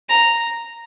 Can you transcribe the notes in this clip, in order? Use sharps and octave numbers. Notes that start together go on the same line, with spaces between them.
A#5